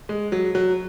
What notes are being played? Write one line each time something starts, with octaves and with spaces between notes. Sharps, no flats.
G#3
F#3
F#3